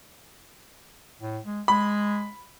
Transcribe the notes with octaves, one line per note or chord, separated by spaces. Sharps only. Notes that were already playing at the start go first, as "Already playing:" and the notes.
A2
G#3
G#3 B5